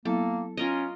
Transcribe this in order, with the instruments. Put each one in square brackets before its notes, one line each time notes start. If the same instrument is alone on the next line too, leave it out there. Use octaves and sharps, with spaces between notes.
[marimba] F#3 B3 E4 [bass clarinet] A#3 [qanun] A4
[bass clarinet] C#4 [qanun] F4 A#4 D#5